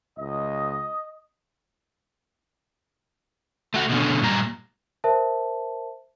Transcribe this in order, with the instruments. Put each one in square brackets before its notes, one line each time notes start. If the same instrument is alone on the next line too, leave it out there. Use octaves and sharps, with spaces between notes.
[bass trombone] C#2 [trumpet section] D#5
[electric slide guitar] A3 F#4
B2 D3 C#4
G2 A#2 G3 A#5
[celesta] A#4 C5 E5 A5